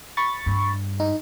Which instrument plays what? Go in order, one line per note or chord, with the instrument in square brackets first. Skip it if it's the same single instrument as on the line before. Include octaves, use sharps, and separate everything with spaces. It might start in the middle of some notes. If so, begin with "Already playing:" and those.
[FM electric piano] B5 C#6 A6
[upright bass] G2
[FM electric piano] D#4